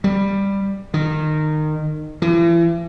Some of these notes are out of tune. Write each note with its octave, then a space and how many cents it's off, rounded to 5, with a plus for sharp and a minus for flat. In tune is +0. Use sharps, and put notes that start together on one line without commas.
G3 +10
D#3 -20
E3 +40